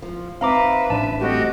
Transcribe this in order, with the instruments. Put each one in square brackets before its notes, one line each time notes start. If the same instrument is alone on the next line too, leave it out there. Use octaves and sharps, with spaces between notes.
[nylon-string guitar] F3
[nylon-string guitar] B3 C4 D#4 [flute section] B4 E5 [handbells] F5 A#5 D6
[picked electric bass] A1 D4 [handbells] A5
[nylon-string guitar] G3 A3 C4 [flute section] F#4 G4 D#5